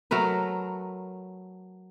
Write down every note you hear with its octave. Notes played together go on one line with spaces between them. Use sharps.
F#3 A3 A#4 B4